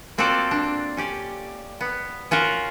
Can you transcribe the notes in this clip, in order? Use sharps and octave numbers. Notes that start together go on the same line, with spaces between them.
A#3 C4 F4 F#4 A4 D5
D4
C#4 G4 D5
B3
C#4 F4 F#4 A#4